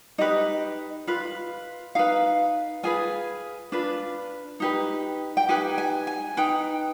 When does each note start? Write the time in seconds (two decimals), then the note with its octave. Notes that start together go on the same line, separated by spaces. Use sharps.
0.18 D#4 G4 B4 D#5
1.07 F4 B4
1.95 D#4 B4 F5
2.83 F4 G#4 B4 G#5
3.72 D4 F4 B4
4.60 D#4 G4 B4
5.37 G5
5.49 D#4 G4 B4 G#5
5.78 G#5
6.07 G#5
6.37 D#4 B4 G5